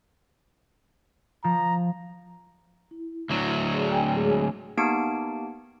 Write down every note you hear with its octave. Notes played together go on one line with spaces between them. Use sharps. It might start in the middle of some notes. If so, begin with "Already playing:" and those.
F3 A#5
E4
D2 F#3
G#4 D5
G5 G#5
G#3 G#4 C#5
G#5
A#3 B3 D#4 G4 A5 D7